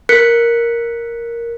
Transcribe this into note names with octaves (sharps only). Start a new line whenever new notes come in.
A#4 F#6 B6 C#7